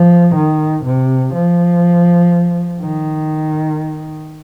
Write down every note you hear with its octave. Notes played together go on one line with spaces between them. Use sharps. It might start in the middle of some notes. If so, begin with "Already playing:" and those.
Already playing: F3
D#3
C3
F3
D#3